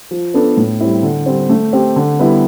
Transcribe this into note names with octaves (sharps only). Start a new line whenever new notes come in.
F3
B3 D4 A4
A2
G3 C4 E4
D3
G3 C4
A3
C4 G4
D3
G3 B3 E4 A4